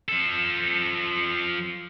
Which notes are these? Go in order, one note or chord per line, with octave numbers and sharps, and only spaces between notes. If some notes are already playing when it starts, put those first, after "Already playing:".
F3 A4